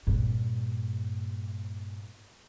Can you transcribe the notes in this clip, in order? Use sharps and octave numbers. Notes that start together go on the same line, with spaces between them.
G2 A#2